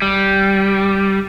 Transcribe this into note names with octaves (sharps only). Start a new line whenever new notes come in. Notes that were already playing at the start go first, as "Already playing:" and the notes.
G3